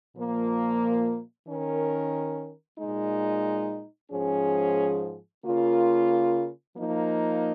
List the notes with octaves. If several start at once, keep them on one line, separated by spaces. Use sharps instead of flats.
A#2 F3 A#3
D#3 C#4 A#4
A#2 G#3 D#4
G#2 F3 C#4 G#4
C#3 A#3 F4 A#4
F3 A#3 D#4